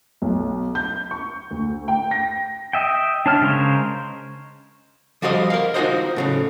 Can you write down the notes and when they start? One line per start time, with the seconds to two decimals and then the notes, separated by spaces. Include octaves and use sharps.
0.22 B1
0.75 G6
1.11 C#6
1.51 D2
1.88 G5
2.11 A#6
2.73 D#5 E5 G5
3.26 D4 C#5 A5 F6
3.41 C#3 G#3 A#4 C5 C#5
5.22 F3 G3 F#4 C5 D#5
5.50 A#4 F5
5.74 D#4 F4 F#4 C5 D#5
6.16 A2 C#3 F#3